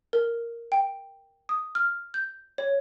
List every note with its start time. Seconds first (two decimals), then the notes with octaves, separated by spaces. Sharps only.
0.13 A#4
0.72 G5
1.49 D#6
1.75 F6
2.14 G6
2.58 C#5